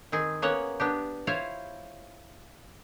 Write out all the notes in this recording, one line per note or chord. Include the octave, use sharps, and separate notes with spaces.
D#3 C4 G#4
A#3 B3 C#4 C#5 F#5
B3 D4 G4
E4 F4 C5 C#5 F5